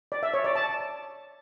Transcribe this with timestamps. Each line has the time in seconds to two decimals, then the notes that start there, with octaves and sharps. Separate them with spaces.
0.12 D5
0.23 E5
0.34 C#5
0.44 D5
0.55 A5